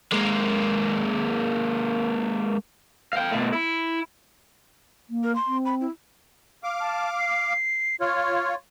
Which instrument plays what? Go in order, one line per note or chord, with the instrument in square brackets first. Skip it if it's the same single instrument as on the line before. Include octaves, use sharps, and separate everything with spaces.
[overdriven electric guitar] G#3 A#3
F5 G5
B2 A3
E4
[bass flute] A#3
[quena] A#4
C6
[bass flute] C4
[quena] B5
E4
[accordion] F5 D6
[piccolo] A5
C7
[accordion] F4 C#5 [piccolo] F6